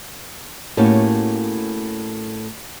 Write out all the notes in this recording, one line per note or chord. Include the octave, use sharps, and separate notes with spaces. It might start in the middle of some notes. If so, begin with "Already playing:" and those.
A2 A#3 C#4 F#4 G4